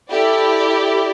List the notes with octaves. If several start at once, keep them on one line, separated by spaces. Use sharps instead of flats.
E4 G4 A4 D5